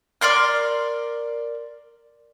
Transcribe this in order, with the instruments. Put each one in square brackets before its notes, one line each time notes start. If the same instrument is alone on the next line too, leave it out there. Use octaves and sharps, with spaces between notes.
[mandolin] A#4 D5 C6 F6